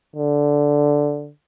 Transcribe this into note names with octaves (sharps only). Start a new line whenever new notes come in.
D3